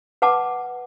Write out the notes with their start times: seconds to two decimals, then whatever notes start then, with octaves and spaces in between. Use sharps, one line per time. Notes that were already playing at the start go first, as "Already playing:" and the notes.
0.22 B4 F#5 A5 D6